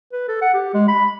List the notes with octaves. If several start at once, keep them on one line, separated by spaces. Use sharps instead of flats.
B4
A4
F#5
G4
G#3
B5